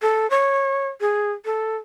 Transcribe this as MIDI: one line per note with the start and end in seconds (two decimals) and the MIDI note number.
0.02 0.29 69
0.30 0.88 73
1.01 1.32 68
1.45 1.76 69